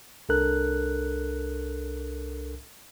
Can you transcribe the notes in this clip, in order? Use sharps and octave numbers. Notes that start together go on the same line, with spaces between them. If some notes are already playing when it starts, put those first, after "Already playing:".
C2 D4 A4 A#4 F#6